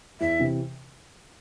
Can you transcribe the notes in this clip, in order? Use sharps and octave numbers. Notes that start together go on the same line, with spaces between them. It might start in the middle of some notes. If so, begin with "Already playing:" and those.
E2 E5
C3 E3